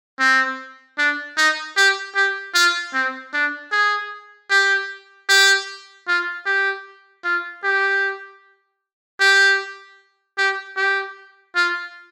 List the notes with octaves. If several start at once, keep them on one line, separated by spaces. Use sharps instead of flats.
C4
D4
D#4
G4
G4
F4
C4
D4
G#4
G4
G4
F4
G4
F4
G4
G4
G4
G4
F4